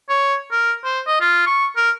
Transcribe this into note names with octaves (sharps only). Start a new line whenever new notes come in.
C#5
A#4
C5
D#5
F4
C#6
A#4